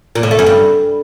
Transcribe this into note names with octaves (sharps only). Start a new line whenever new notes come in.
A#2
A2
A3
F#2
G2